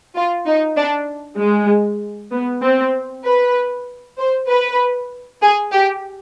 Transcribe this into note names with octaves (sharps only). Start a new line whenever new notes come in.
F4
D#4
D4
G#3
B3
C4
B4
C5
B4
G#4
G4